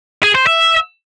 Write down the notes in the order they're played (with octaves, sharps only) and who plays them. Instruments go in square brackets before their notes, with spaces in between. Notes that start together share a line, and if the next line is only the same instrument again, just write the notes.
[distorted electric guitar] G#4
C5
E5